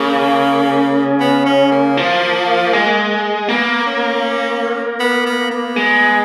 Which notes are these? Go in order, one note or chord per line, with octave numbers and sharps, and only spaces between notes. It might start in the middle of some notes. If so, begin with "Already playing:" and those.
Already playing: C#3 A#3
B3
C#4
A#3
F3
G#3
A#3 B3
C#4
B3
B3
B3
G#3